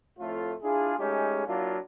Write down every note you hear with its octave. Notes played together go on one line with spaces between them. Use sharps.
F2 A2 A3 F4
D4 E4 F4 G#4
G#3 A3 C#4 D#4 G4
F#3 A#3 D4 E4 F4